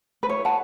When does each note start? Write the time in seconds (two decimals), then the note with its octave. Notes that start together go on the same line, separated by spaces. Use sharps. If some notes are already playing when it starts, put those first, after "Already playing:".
0.23 B4
0.28 E4 C#5
0.45 F#5 A5